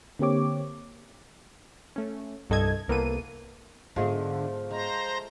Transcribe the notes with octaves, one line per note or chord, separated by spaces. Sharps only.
D3 A#3 C4 G4 C#5 D6
A3 C#4
C2 G2 A4 D#5 A5 G#6
C2 A#3 B3 A4 D#7
G#2 D3 F3 G#3 A3 B3 G#4 D#5
G#3 C5 A#5